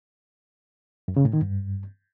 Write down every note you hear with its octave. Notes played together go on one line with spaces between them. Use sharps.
F#2
C#3
A2
D#3
G2